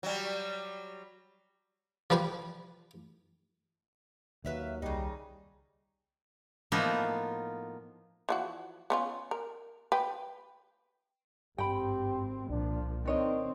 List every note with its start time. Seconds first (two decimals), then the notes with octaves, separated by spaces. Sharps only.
0.03 F#3 G3
2.10 F3 G3 B4 G5 G#5
4.45 D#2 F#3 B4 E5 F5
4.82 C2 C#3 G3 D#4
6.72 A2 F3 A#3 B3 D#4
8.29 E3 F3 F#4
8.90 B3 C#4 F4
9.31 A#4
9.92 B4 G5
11.58 G#1 G2 C4 G4 G5 B5
12.49 C2 A#2 F3 D4
13.05 D#3 C4 D4 C#5 D#5